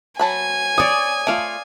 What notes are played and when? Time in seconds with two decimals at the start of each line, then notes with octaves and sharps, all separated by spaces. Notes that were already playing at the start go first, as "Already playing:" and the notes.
0.19 F#3 G#5 A5 B5
0.78 C#5 D5 D#6
1.27 A3 F4 D5 F5